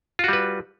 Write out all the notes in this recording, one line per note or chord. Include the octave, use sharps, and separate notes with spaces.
G3 F4 F#4 B4